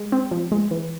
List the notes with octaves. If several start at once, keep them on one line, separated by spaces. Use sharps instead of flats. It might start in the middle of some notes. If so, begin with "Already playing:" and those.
Already playing: G#3
C4
F3
G#3
E3